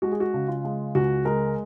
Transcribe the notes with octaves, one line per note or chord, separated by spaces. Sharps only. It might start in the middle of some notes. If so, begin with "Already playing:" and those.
G#3 F#4
G#4
F#4
C#3
F4
G#3
C#2 F#4
G#3 A#4